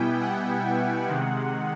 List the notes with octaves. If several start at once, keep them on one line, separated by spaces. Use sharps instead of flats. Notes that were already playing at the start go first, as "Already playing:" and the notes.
Already playing: B2 G3 B3 E4 G5 G#5
F#5
C3 D#3 G#3